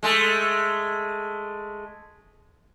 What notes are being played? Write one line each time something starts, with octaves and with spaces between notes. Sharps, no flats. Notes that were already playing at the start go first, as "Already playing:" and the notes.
G#3 A3